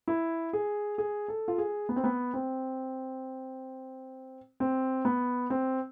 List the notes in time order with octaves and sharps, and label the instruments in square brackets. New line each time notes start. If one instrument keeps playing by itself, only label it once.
[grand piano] E4
G#4
G#4
A4
F4
G#4
B3
C4
B3
C4
C4
B3
C4